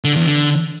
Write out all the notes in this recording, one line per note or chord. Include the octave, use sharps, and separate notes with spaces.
D3
E2
D3